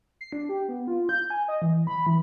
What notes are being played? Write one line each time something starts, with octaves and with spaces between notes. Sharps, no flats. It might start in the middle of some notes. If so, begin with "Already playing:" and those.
C7
D4
G4
B3
F4
G6
G#5
D#5
E3
B5
E3